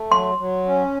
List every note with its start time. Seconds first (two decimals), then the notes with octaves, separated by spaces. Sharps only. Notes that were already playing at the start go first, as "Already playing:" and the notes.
Already playing: A3
0.11 F#3 C6
0.38 F#3
0.65 C#4